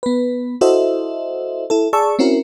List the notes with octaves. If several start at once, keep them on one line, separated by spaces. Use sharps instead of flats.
B3 B4
E4 F#4 A4 C5 D#5 E5
E4 A4
G#4 D5 A5 C#6 E6
C4 C#4 E4 F#4 A#4